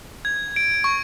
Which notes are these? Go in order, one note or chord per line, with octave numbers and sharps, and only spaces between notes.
G#6
D7
C#6